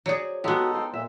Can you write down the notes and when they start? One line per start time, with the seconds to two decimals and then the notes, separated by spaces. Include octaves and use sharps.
0.06 F#3 G#4 C5 D5
0.44 G#3 B3 D#4 F#4 G4 A4
0.74 C5 G5
0.93 A#2 E5